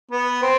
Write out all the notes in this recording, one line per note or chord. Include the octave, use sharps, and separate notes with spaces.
B3
C4